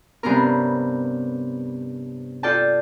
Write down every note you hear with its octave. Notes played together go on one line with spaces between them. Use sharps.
G2 C3 B3 C#4 A#4
F4 A4 D5 G5 A5